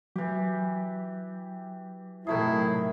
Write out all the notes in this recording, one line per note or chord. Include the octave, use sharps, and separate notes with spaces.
E3 F#3 G4
A2 C3 D#3 F#3 A3 E4 G#4